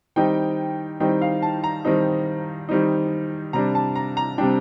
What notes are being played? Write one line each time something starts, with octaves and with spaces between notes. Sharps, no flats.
D#3 G3 C4 D#4 G5
D#3 G3 C4 D#4 G5
F5
A5
A#5
D#3 G3 C4 D#4
D#3 G3 C4 D#4
C3 G3 D4 A#5
A5
A#5
A#5
C3 G3 D4 G5